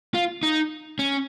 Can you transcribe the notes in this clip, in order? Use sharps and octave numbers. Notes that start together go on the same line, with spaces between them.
F4
D#4
C#4